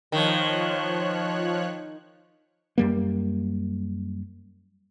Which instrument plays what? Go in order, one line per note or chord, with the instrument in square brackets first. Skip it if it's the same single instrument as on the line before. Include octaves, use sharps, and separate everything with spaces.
[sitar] D#3 [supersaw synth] F3 C#5 F#6
[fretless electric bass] F#2 G3 A#3